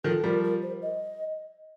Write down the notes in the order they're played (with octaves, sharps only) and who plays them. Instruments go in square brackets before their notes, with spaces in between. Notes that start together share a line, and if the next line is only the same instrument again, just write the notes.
[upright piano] D#3 F3 [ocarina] A4
[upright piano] F3 G3 [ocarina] A#4
[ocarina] A#4
C5
D#5